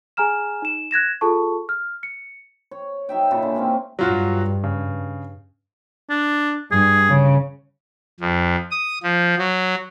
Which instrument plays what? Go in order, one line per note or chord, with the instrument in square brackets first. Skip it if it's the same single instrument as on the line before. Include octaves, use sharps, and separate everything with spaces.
[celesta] G#4 G#5 A#5 F6 E7
D#4 E7
F#6 G#6 A#6 E7
F4 G#4 A4 A5 C#6
F6
C#7
[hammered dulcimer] C#5
F#3 D#4 E5 G5
A#2 C#3 E4 A4
D3
G#3 A#3 C4 C#4
[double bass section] G2 [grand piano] F#3 F4 F#4
[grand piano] C#3
[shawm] D4
[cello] G2 [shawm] G#4
[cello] C#3
[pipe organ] F2
D#6
F3
F#3